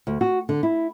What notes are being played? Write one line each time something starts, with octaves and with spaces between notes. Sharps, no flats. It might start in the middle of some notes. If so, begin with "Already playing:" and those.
D2
F#4
D3
E4